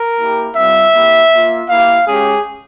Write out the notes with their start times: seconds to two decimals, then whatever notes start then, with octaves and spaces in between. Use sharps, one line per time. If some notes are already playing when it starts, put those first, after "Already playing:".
Already playing: A#4
0.19 A#3 E4 G4
0.56 G3 C4 F4 E5
0.94 A#3 E4 G4
1.32 A#3 F4
1.69 A#3 E4 G4 F5
2.06 G#3 C#4 G4 G#4